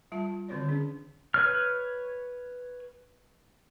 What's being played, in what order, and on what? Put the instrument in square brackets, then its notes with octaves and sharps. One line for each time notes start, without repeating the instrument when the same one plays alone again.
[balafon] G3 F4 A5
D3 D#3 C4 F#4 C#5 D5
C#4 D4 G#4
[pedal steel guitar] B4 C#5 F6